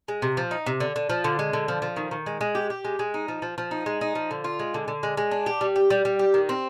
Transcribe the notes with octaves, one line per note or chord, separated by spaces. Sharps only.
G#3
C3
F3
D#4
C3
D3
D3
F3
D3
G#3
D3
F3
F3
D#3
D#3
G#3
G#3
G4
G4
G#3
G#3
D#4
F3
F3
F3
D#4
G#3
D#4
F3
D3
F4
G#3
D3
D3
G#3
G#3
D4
G4
G3
G4
G3
G3
G4
D#3
C4